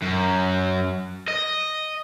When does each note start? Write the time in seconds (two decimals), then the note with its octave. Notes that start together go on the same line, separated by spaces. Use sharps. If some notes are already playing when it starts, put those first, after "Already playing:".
0.02 F#2
1.28 D#5